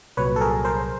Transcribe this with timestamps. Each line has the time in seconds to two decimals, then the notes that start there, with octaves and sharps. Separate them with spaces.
0.17 C2 A#2 F#3 B4 C#5
0.36 A4
0.41 G#4 A#4
0.65 A#4 C5